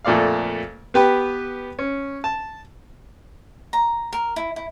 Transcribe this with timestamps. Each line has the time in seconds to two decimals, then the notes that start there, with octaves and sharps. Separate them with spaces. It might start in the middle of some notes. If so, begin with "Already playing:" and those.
0.05 F2 A#2 A3 D5 F5
0.94 B3 G4 B4
1.79 C#4
2.24 A5
3.73 A#5
4.13 A#4
4.36 E4
4.56 E4